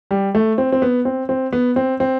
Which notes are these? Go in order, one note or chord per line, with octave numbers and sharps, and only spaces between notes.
G3
A3
C4
C4
B3
C4
C4
B3
C4
C4